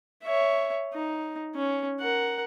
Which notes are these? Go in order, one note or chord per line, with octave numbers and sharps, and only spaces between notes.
C#5 E5
D#4
C#4
A#4 F#5